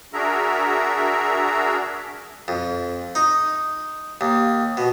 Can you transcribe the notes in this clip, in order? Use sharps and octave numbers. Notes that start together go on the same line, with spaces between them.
D4 F#4 G#4 A#4 E5 A#5
F2
D#4
D#2
B2